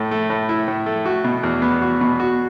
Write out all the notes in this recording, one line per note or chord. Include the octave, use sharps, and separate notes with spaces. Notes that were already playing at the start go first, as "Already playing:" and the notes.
Already playing: A2 A3
A3
A2
E4
A2
A3
F#4
B2
E2
B3
F#4
B2
F#4